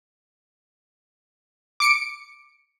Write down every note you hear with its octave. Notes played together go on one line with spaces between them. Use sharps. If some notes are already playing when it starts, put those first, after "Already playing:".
D6 C#7 D7